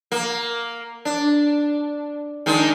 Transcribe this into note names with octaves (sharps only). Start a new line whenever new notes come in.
A#3
D4
D#3 G#3 D4